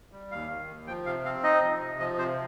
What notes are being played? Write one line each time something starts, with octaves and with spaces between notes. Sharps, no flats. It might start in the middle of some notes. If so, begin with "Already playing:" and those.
G3
D#2 F5
D#3
D#2
F3 G5
C3 F5
C4 F5
D#4 D#5
F3
C3
F3 D#5
C3 C5